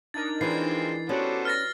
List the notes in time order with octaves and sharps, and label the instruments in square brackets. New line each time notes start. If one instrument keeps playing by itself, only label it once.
[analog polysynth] D4 D#4 A#4 [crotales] A6
[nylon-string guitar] E3 [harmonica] F3 G#3 C4 [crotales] C7
[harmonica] B3 A4 C5 [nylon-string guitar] C#4 [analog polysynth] F#4 G4 D5
[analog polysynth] B4 [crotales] F6 A6 A#6